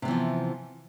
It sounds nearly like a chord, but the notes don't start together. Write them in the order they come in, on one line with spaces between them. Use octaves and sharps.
C3 B3 E3 F3